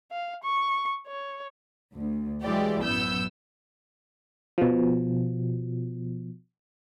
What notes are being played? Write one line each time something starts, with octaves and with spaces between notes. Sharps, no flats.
F5
C#6
C#5
D2
E3 F#3 G#3 E4 G4 D5
A1 F#2 B3 E6 G6
B2 F3